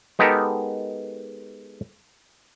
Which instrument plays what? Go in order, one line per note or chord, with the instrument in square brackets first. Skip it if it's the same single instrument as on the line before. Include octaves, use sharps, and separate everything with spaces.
[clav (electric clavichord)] G#3 B3 D#4 G4 A4 A#4